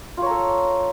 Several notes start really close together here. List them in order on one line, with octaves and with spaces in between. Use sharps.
F4 C#5 A#5 A4